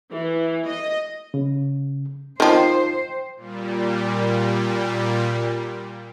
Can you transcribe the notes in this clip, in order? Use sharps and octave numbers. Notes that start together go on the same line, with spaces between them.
E3
D#5
C#3
D#3 F3 C5 G5
A#2 G3